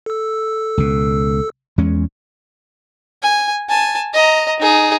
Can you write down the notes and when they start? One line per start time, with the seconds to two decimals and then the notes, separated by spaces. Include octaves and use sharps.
0.06 A4 E6
0.78 C#2 B2
1.78 E2 G#3 C#4
3.22 G#5
3.69 G#5 A5
4.14 D#5 A#5
4.60 D#4 G#4